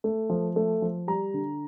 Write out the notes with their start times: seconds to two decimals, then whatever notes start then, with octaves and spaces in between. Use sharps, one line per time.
0.04 A3
0.30 F3
0.56 A3
0.82 F3
1.08 G3 A#5
1.34 D3